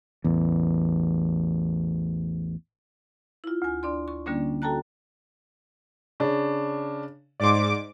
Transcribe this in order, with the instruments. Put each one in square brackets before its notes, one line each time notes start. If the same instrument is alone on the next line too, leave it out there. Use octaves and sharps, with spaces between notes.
[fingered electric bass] A1 E2
[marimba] E4 F4
D2 G#5
D4 D5 C6
C#6
D3 G3 A#3 C#4 D4
F#4 A4 G5 A5 A#5 F#6
[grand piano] C#3 D4
[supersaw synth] G#2 D6 [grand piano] D5 C6